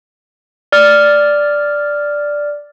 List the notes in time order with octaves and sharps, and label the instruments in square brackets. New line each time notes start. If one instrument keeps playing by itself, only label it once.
[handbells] D5 F6